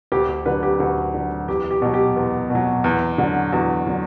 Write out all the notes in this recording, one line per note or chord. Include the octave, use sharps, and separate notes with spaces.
D2 G4
G4
D3 F#3 B4
G4
D2 F#4
D3 F#3
E2 G4
G4
B2 F#3
G4
E2
B2
F#3
E2
D3 F#3
E2 F#4
D3 F#3